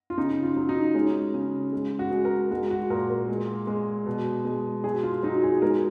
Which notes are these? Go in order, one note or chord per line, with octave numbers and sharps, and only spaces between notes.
F4
C#3 D#4
F4
F#3
D#4
G#3 C#4
C#3
G#3
F#4
G#3
A#4
G#3 F#4
F#4
A#2 A#4
A#4
G#3
G#3
B2
G#3
F#3 G#4
F4
F#3 D#4
G#4
G#3 A#4